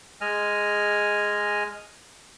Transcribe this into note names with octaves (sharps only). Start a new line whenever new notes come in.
G#3 D#5 G#5 F6